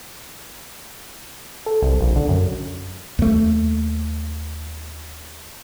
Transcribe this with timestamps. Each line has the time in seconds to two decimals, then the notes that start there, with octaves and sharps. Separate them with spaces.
1.66 A4
1.82 C2
2.00 A#1
2.16 D3
2.29 F#2
3.19 D#2 A3